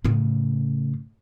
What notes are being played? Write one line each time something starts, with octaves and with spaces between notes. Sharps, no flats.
A2 C#3